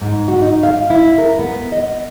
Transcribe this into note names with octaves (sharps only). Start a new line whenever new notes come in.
G#2
F#4
D#4
F5
E4
A#4
B3
D#5